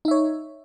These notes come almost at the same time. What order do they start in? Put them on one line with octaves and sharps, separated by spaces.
D#4 E5 C#5